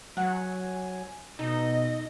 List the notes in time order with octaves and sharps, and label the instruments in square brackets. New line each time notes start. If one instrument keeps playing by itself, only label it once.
[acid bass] F#3 [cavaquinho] F#5 [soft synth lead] G#5
[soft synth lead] B2 [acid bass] D#4 [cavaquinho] A4 [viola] D#5